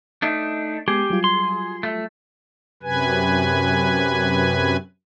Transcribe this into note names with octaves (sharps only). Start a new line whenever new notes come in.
A3 D4 D#4
G#3 B3 G4 G#4
F#3 G3 F4
C6
A3
F#2 C3 B4 G#5